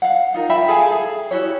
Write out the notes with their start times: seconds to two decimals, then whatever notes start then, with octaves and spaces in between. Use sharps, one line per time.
0.02 F5 F#5
0.34 D#4 F4 A#4
0.49 F4 E5 G5 B5
0.68 G#4 A4 F5 G#5
0.92 G#4
1.31 E4 F#4 G4 C#5